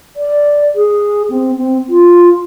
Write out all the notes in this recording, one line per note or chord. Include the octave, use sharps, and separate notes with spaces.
D5
G#4
C4
C4
F4